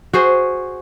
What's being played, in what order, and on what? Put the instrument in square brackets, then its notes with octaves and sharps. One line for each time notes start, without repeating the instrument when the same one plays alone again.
[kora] F#4 G#4 C5